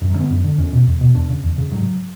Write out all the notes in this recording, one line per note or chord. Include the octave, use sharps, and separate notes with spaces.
F#2
F#3
D3 C#4
B3
F#2
D3
E2 C#4
B2
E2
B2
E2 D4
C#3
E2
C#3
G#2 F#3